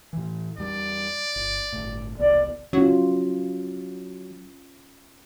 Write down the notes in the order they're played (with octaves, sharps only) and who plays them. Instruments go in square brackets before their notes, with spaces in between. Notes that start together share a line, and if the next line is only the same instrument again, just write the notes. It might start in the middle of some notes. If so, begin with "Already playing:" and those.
[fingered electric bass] A2 E3
[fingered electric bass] E2 G3 [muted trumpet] D5
[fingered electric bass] G1
G1 A2
[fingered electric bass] E1 C2 B3 [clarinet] D5
[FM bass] F#3 [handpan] C#4 F4